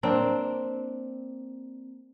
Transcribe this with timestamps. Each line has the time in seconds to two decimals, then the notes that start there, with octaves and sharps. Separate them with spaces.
0.03 A#3 C4 D4